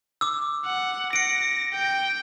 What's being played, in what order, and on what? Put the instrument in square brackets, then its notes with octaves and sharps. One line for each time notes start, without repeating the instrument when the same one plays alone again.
[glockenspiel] D6 E6
[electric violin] F#5
[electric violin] A#6 [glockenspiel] C#7 D7
[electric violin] G5